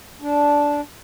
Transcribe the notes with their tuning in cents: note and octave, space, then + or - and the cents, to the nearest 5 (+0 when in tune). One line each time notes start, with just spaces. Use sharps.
D4 -10